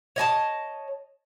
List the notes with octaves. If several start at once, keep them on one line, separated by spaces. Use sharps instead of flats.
C#5 D#5 G#5 A5